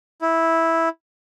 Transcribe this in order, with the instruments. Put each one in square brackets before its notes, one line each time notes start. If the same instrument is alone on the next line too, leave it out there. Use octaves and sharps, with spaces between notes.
[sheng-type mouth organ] E4